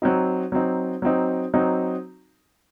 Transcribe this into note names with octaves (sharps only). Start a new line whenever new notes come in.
F#3 C4 D#4
F#3 C4 D#4
F#3 C4 D#4
F#3 C4 D#4